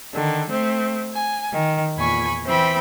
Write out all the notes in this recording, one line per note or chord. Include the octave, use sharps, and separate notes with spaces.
D3 D#3
A3 C4
G#5
D#3
E2 A#2 G#5 B5 C#6
E3 C4 G5 B5